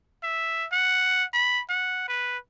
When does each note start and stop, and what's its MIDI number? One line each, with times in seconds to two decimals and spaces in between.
0.23 0.66 76
0.72 1.24 78
1.34 1.61 83
1.69 2.05 78
2.08 2.38 71